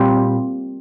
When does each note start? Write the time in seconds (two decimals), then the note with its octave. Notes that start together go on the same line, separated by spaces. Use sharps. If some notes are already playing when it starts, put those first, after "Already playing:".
Already playing: A#2 G3 C4